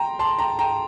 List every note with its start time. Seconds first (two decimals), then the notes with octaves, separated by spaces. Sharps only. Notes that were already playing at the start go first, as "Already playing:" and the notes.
Already playing: G5 A#5 C6
0.19 A5 C6
0.38 G5 A#5
0.59 G5 A#5